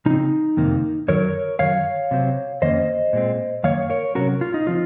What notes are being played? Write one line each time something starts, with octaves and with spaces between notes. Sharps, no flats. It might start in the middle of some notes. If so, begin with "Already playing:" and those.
C#3 F3 C4 D#4
F2 C3 D#3 A#3
F#2 D#3 F#3 A#4 C#5
F#2 D#3 F#3 C#5 F5
C3 F#3 C4
F2 D#3 A#3 C#4 C5 D#5
A#2 G#3 C4
F#2 D#3 A#3 C#5 F5
A#4 C#5
C3 F#3 C#4 F#4 A#4
F4
D#4
F3 C4 F4